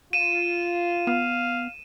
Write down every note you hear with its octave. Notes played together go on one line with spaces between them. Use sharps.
F4 D#7 E7
B3 F5